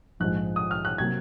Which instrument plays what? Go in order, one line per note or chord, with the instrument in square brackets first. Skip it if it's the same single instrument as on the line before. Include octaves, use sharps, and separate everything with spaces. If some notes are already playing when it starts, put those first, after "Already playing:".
[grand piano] A#1 G#2 F3 G#3 F#6
D#6
F6
F#6
C3 F#3 A#3 G#6